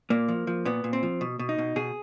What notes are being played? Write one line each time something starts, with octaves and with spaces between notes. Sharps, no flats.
A#2 A#3
F3
F3
A#2 B3
A#2
C4
F3
B2
B2
D#4
B2
B2 G#4